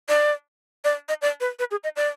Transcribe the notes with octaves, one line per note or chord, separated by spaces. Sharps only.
D5
D5
D#5
D5
B4
B4
G#4
D#5
D5